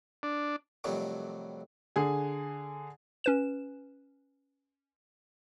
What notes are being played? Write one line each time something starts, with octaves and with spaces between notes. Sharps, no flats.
D4
F2 C3 D#3 F#3 G3 A3
D3 G#4 G#5
C#4 B4 E7